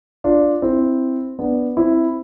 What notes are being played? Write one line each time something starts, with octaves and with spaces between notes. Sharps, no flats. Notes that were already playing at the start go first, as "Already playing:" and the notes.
D4 F4
C4 E4
B3 D4
C4 E4